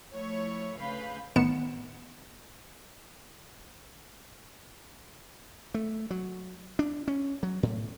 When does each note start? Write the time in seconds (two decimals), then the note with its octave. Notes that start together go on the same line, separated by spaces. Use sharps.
0.13 F3 A3 E4 C#5
0.79 D2 C#3 B4 F5 B5 G6
1.36 A1 D#3 B3 C#7 E7
5.74 A3
6.10 F#3
6.79 D4
7.08 C#4
7.43 F#3
7.63 A2